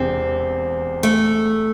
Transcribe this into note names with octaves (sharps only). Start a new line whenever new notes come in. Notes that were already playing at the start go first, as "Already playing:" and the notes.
Already playing: E1 E2 C3 C4
A3